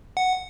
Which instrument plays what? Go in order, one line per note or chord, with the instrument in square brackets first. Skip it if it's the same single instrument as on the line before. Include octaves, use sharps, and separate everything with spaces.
[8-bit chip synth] F#5